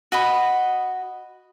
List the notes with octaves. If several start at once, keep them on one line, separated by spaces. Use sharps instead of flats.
F#4 D#5 B5